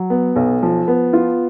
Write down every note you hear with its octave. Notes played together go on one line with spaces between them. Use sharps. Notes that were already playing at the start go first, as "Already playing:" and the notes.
Already playing: F#3
B3
B1
F3
B3
F4